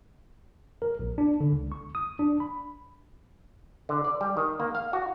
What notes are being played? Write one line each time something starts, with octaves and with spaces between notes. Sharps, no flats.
A#4
A#1
D4
D3
C#2
C#6
D#6
D4
B5
D3
D5
G3
D#3
A#3
F5
F#4